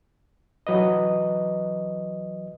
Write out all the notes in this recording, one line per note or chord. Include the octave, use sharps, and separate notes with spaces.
E3 F#3 B4 D#5